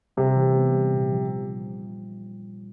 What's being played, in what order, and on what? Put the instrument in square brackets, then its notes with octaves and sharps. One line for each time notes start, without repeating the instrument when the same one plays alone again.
[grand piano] C3 [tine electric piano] G3
[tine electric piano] E3
B3
G3
A#2
F3